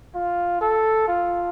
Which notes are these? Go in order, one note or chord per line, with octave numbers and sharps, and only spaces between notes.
F4
A4
F4